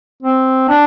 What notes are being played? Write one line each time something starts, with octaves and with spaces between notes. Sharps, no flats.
C4
D4